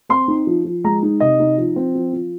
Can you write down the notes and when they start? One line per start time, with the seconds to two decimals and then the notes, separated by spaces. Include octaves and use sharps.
0.09 C4 C6
0.28 D#4
0.47 F3
0.65 F3
0.84 G#3 A#5
1.03 D#4
1.20 C3 D#5
1.40 D#4
1.58 F3
1.76 C4
1.95 F3
2.13 F3